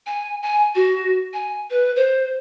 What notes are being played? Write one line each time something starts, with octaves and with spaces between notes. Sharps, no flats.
G#5
G#5
F#4
G#5
B4
C5